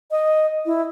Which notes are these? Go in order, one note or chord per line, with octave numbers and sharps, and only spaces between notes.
D#5
E4